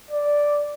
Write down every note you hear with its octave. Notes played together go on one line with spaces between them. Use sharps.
D5